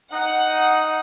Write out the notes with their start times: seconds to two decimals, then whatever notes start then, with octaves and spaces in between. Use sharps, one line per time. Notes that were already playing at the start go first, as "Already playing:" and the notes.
0.13 D#4 F#5